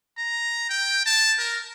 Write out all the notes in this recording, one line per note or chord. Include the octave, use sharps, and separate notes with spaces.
A#5
G5
A5
A#4